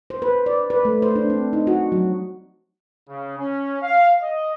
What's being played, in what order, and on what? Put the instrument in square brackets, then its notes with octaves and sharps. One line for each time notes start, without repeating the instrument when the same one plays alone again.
[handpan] C5
B4
D5
B4
A3
C5
D4
C4
D#4
F#4
F#3
[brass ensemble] C#3
C#4
F5
D#5